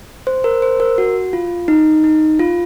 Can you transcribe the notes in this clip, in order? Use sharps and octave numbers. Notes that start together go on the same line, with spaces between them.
C5
A#4
C5
A#4
F#4
F4
D#4
D#4
F4